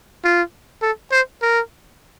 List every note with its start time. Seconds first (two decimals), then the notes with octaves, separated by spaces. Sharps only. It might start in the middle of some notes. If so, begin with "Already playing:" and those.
0.24 F4
0.82 A4
1.12 C5
1.42 A#4